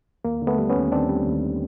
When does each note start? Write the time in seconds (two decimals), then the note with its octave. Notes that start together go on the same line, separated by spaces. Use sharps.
0.25 D#2 A#3
0.42 D3
0.47 A3 B3
0.59 G3
0.69 B3 C#4
0.76 D#2
0.92 D#2 C4 D4
1.09 G3
1.27 D#2